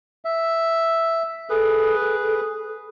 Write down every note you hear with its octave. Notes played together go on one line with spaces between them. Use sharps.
E5
G#4 A4 B4